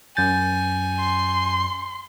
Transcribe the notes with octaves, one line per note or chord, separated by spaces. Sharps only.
F#2 G#5 G6 A6
C6